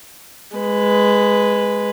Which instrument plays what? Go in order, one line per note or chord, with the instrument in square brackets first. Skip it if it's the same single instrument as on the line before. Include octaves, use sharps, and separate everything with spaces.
[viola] G#3 B4